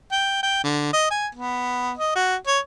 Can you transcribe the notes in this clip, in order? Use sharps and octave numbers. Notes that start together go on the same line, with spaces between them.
G5
G5
D3
D#5
G#5
B3
D#5
F#4
C#5